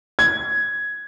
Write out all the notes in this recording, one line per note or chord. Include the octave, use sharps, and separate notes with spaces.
G#6